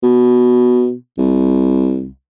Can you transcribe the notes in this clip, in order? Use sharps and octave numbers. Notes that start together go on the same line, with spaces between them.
B2
C2